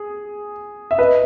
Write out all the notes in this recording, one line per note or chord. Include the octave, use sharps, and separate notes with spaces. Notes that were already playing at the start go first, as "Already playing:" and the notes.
Already playing: G#4
E5
B4 D#5